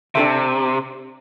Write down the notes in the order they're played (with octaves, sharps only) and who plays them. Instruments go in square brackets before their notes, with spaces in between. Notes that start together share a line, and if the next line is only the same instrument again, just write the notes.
[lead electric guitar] C3 [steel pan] D4 A4 E5